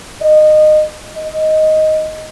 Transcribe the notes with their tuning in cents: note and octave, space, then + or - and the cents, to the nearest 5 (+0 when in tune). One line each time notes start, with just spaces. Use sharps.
D#5 -20
D#5 +5